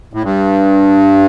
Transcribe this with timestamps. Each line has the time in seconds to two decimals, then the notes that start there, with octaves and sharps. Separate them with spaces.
0.14 A2
0.23 G2